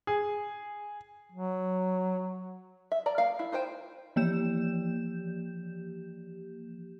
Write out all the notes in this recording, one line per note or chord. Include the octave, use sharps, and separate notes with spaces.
G#4
F#3
E5
D5 A#5
A#3 F5
E4
D#4 F4 C5 G5
E3 F3 A#3 G4 G6 E7